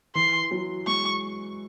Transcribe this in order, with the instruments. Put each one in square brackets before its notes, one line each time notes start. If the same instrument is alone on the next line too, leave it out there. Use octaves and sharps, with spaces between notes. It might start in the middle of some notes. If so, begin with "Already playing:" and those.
[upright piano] E3 [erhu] C6
[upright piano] F#3
[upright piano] G#3 [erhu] C#6